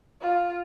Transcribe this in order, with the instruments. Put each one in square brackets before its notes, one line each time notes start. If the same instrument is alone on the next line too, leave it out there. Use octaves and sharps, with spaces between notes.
[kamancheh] F4